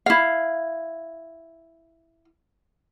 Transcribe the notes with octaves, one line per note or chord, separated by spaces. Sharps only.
E4 F5